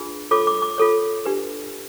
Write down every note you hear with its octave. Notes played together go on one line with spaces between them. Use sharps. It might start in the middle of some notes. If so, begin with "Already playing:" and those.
Already playing: D4 F4 G#4 B4
F4 A4 C#5 D6
D6
D6
F4 A4 C#5
D4 G4 B4